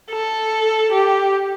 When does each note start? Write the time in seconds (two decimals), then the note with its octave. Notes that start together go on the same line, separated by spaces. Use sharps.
0.11 A4
0.92 G4